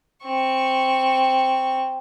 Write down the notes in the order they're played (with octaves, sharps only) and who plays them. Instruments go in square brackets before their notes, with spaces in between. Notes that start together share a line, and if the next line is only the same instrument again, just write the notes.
[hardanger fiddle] C4 C#6